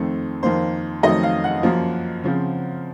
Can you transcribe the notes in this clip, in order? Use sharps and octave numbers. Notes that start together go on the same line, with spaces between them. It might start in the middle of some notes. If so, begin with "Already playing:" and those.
Already playing: F2 D#3 A3 C4
F2 D#3 A#3 C5
F2 D#3 F#3 A3 C4 D#5
F5
F#5
F#2 F3 A#3
C#3 F3 C4